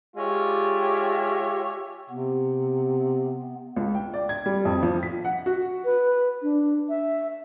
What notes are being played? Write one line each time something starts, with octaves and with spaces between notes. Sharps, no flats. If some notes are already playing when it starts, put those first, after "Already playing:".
G#3 F4 G4 C#5 D5 E5
C3 B3
C#2
G5
D5
G#6
G3
F2
F3
B6
F#5
F#4
B4
D4
E5